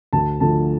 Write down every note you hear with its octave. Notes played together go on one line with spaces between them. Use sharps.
D2 A5
D3 F3 A3 A5